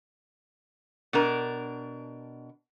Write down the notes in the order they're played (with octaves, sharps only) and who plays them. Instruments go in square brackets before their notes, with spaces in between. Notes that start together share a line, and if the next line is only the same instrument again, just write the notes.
[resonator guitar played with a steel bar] B2 D4 A#4